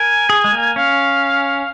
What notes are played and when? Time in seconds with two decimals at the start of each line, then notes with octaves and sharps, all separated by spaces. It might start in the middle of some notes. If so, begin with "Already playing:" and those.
Already playing: A#4 G#5
0.30 G#4
0.44 G#3
0.52 A#3
0.76 C#4 F5